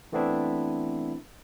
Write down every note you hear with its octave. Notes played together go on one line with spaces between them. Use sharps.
E3 A3 B3 C4 D4 E4